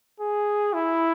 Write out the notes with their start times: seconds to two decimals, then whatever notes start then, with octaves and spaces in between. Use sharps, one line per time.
0.20 G#4
0.73 E4